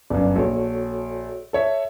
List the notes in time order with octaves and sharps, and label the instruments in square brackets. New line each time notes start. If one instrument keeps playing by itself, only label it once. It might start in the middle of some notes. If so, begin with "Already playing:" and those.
[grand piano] G1 F#2 [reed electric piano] D5 F5
[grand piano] A#1 [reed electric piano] F#4 A4 C#5
[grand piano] A4 C#5 E5